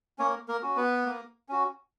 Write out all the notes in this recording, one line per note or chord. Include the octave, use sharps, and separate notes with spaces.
A#3 C#4 C#5
A#3 A#4
C#4 F#4
B3 B4
A#3
C#4 F#4